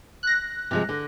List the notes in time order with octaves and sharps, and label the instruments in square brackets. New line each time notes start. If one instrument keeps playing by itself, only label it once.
[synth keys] F#6 A#6
[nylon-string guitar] C3 F3 G#3
D3